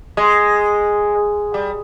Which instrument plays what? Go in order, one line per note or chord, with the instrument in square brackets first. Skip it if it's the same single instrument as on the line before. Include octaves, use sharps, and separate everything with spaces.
[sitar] G#3
G3